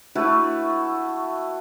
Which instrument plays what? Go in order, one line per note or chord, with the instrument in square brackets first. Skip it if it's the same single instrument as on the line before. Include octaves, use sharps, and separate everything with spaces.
[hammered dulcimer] A3 E4 F#4 B4